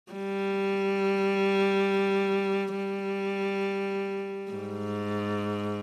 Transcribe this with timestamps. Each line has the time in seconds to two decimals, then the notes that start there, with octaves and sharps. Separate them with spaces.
0.12 G3
2.76 G3
4.52 G#2